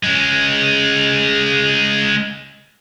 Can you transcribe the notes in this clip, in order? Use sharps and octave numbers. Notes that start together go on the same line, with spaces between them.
G#3 C#4